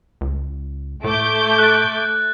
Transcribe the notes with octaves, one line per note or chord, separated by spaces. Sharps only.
C#2
A2 A3 D6 G6
F#6 A6